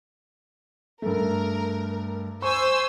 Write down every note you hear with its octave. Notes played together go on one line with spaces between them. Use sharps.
G2 A3 A#4
C5 G#5 C#6 E6